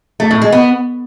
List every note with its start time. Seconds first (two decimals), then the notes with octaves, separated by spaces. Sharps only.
0.20 A3
0.31 A2
0.42 G#3
0.52 B3